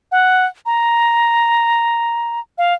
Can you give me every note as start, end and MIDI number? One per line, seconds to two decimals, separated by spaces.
0.12 0.45 78
0.66 2.40 82
2.58 2.74 77